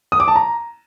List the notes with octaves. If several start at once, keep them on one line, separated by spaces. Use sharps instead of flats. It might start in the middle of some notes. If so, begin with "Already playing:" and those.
D#6
D6
A5
A#5